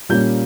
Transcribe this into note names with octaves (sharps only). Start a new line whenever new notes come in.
A#2 G3 A#3 C#4 G6